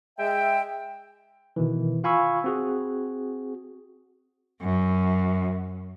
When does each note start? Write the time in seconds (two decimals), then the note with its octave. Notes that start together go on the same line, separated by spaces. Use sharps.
0.19 G#3 E5 G5
1.56 B2 D#3 E3
2.04 F4 F5 G#5 B5 C#6 E6
2.44 C4 F#4 G#4
4.61 F#2